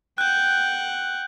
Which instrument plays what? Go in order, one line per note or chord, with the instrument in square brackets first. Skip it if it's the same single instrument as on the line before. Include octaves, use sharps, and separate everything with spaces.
[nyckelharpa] F#5 G5 [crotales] F#6 G6